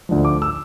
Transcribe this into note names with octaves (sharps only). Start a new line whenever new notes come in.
D2 D3 F3
D6
E6